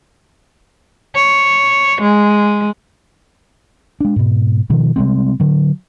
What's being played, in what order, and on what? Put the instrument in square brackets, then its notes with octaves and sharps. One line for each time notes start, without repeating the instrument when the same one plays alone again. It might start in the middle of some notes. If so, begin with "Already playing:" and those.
[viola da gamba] C#5
G#3
[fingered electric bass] G#3 D4
G#2 B2
B2 D#3 F3
C3 G3 G#3 C4
D3 F#3